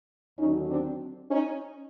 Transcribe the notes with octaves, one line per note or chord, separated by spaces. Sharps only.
D#2 D3 F#3 C#4 D#4
C4 D4
C#4 D#4